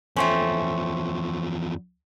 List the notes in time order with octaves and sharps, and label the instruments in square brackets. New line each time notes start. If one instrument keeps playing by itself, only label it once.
[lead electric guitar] E2 F3 [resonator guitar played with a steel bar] A3 C4 C#4 [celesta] A4 C6 C#6